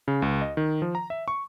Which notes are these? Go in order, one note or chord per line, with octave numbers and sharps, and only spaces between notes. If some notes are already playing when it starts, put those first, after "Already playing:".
C#3
C#2
D#5
D#3
F3
A#5
E5
C#6